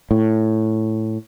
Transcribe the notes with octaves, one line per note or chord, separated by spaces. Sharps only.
A2